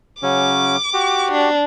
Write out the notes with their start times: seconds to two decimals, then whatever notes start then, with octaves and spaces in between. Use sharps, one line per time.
0.23 C#3 F#3 C#4 D6
0.94 F#4 G4
1.32 D4